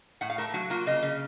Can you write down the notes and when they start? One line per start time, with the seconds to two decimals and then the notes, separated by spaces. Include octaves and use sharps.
0.21 A2 F#5
0.30 F5
0.38 A3 A#4
0.53 F#3 F#4
0.70 A#3 F4
0.86 C#3 D#5
1.03 C#3